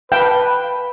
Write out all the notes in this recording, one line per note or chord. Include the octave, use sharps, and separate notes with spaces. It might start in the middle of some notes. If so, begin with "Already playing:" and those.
B4 F5 G5 A5 B5